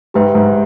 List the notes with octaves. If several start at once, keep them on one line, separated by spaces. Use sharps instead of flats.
G#2 G4 B4 E5 G5
G#2